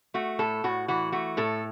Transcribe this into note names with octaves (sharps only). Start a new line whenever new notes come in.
A3 F#4
A2 A4
A2 F#4
E3 F#4
A3 F#4
A2 A4